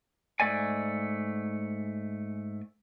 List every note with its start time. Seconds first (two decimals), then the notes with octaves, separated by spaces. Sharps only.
0.40 G#2 G3 A3 D5 G#5